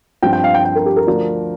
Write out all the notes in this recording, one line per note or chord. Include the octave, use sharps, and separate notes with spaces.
G2 F3 C4 G5
G5
F5
G5
G5
A#4
G4
A#4
D2 D3 F3 D4